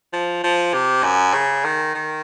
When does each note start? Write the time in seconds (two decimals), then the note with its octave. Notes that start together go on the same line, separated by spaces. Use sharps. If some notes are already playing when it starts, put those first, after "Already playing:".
0.13 F3
0.44 F3
0.74 C3
1.03 F#2
1.33 C#3
1.64 D#3
1.94 D#3